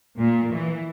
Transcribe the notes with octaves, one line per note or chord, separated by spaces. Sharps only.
A#2
E3